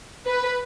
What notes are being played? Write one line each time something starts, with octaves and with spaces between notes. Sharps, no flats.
B4